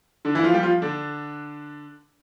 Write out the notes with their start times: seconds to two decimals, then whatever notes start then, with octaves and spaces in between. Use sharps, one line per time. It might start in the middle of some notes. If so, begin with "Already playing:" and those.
0.25 D3 D4
0.35 E3 E4
0.43 F3 F4
0.54 G3 G4
0.63 F3 F4
0.82 D3 D4